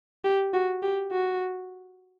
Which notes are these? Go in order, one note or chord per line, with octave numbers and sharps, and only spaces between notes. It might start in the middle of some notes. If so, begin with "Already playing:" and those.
G4
F#4
G4
F#4